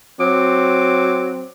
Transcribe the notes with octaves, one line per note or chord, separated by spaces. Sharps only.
F#3 C4 D6